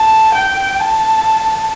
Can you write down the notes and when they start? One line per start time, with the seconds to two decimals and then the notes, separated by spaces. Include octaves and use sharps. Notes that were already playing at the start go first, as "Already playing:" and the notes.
Already playing: A5
0.35 G5
0.80 A5